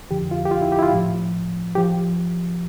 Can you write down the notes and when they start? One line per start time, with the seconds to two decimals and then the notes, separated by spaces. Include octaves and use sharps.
0.10 F2 D3 F3 G4
0.31 F4
0.45 G4
0.51 F4
0.62 E4
0.72 G4
0.79 E4
0.83 F4
0.93 A2 F3
1.75 F3 G4